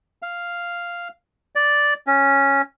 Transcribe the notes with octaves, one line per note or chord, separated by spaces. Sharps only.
F5
D5
C#4